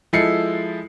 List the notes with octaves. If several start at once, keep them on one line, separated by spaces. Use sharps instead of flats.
F3 G#3 E4 A4 C7 C#7